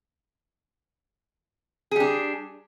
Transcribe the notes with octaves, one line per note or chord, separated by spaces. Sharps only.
G3 D4 G#4